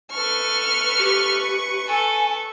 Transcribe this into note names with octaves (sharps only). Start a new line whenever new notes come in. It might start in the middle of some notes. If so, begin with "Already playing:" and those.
A4 B4 C#6 F6
G4
A4 G#5